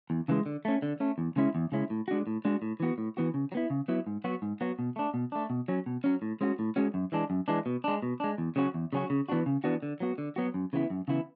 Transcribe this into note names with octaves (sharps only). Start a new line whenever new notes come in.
E2
C#3 E3 G#3
D3
A3 C#4
D3
A3 C#4
E2
C#3 G#3 C#4 E4
E2
C#3 G#3 C#4 E4
A2
G#3 D4 F#4
A2
G#3 D4 F#4
A2
E3 B3 F#4
A2
E3 B3 F#4
C#3
F#3
B3 E4
C#3
F#3 B3 E4
G#2
F#3 B3 F#4
G#2
F#3 B3 F#4
B2
A3 D4
B2
A3 D4
B2
F#3 C#4
B2
F#3 C#4
A2
G#3 C#4 F#4
A2
G#3 C#4 F#4
F#2
E3 G#3 D4
F#2
E3 G#3 D4
B2
G#3 D4
B2
G#3 D4
E2
C#3 F#3 C#4 F#4
E2
C#3 F#3 C#4 F#4
C#3
E3 B3 D4 F#4
C#3
E3 B3 D4 F#4
D3
F#3 B3 F#4
D3
F#3 B3 F#4
F#2
C#3 E3 B3 E4
F#2
C#3 E3 B3 E4